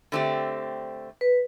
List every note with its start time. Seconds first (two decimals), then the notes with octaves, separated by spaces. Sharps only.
0.12 D3 A3 C4 G4
1.21 B4